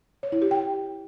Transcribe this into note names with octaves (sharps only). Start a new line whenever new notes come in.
C#5
E4
G4
G5